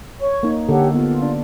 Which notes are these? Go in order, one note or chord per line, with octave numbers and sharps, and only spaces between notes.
C#5 C#6
A#3 D#4
D3 A#3 G4 A4 C#5 F#5
B3 F4
D4